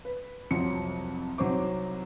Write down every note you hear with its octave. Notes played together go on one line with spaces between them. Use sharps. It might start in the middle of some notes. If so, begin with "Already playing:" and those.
B4
C2 F2 F3 F#3 C#7
C2 F#3 D#4 C5 C#6 D6